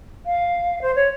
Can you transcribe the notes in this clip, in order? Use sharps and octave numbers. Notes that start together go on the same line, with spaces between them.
F5
C5
C#5